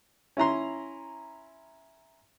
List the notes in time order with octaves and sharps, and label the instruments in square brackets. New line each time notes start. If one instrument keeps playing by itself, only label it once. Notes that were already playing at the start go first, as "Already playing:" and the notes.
[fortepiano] C#4 E4 A#5 C6